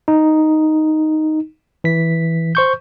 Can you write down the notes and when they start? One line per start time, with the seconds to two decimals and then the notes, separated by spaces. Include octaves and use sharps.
0.08 D#4
1.84 E3 B6
2.55 C5 C#6 G6